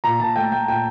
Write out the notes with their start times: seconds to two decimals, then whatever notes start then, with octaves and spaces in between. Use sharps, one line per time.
0.04 A#2 A#5
0.20 A#2 A5
0.36 A3 G5
0.52 A3 G5
0.68 A#2 G5